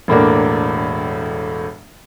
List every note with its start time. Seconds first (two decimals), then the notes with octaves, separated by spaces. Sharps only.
0.08 E1 A2 A#3 D4